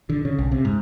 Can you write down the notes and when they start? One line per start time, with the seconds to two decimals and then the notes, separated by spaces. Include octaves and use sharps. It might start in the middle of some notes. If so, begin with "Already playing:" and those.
0.09 D3
0.25 C#3
0.39 B1
0.52 C3
0.65 G#2